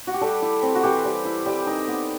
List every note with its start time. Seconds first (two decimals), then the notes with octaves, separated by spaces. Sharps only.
0.07 F#4
0.14 G4
0.21 G3 A4
0.42 E4
0.63 C4
0.75 F#4
0.83 E3 G4
1.05 G3
1.25 E4
1.46 G3 G4
1.67 D#4
1.88 B3